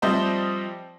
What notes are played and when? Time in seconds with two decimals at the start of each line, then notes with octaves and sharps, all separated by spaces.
0.02 F3 G3 C4 C5 D#5 E5